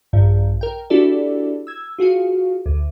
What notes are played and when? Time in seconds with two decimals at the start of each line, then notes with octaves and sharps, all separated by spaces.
0.13 A#1 G2
0.61 A#4 G5
0.90 D4 E4 F#4 G4 A4 D5
1.67 E6 G#6
1.98 F4 F#4 G#4 F5
2.66 D2